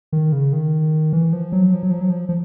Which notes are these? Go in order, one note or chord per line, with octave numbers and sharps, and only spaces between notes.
D#3
C#3
D#3
E3
F3
F#3
F3
F#3
F3
F#3
F3
F3